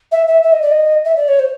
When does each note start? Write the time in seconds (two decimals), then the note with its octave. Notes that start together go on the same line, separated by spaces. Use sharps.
0.11 E5
0.27 E5
0.43 E5
0.52 D#5
0.62 D5
0.71 D#5
1.04 E5
1.16 D5
1.28 C#5
1.39 C5